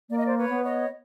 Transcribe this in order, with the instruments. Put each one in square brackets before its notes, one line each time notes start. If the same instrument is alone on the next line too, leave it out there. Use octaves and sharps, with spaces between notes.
[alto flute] A#3 [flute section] D5
[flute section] D#5
C5 D5
B4 C#5
[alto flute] B3
[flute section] C#5 D#5